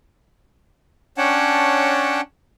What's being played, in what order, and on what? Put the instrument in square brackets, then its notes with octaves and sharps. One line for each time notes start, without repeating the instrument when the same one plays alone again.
[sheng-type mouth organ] C#4 D4 C#5 F#5 G5 A5